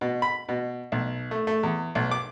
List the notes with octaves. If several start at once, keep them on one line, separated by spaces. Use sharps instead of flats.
B2
B5
B2
B1
A3
A3
E2
B1
D6